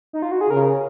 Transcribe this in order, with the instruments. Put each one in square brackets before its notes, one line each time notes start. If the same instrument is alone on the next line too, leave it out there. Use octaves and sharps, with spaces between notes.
[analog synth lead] D#4
F4
F#4
G#4
[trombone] C#3 [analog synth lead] A#4